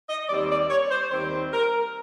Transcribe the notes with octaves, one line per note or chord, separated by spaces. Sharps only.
D#5
D#2 D#3 G3 C4 D5
D5
C#5
C5
D#2 D#3 G3 C4 C5
A#4